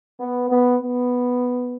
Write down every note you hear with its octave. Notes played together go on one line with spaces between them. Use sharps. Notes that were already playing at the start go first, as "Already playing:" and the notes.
B3
B3
B3